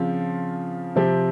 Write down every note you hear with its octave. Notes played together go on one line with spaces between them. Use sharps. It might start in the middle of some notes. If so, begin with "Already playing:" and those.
Already playing: C#3 F3 C4 F4
C3 F3 C4 G4